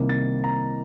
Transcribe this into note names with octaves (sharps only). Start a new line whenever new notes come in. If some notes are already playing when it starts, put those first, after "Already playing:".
Already playing: C2 C3 D#3 G3 A#3
A6
A#5